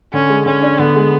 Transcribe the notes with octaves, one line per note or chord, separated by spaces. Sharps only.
D3 C#4
G#3
D3 C#4
D4
D3 B3
G#3